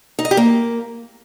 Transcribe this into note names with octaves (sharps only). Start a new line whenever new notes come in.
D#4
D#5
G4
A#3